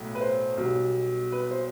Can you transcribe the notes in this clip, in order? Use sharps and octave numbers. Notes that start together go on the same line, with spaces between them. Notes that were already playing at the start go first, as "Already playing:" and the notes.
Already playing: B1 A2 F#3 A3
B4
C5
B1 B2 G3
B4
C5